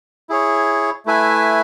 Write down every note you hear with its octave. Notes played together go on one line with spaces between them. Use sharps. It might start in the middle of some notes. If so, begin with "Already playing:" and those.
E4 G#4 C#5
A3 E4 B4 E5 G#5